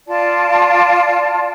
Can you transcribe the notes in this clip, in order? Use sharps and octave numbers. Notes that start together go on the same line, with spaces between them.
F4 D5 A5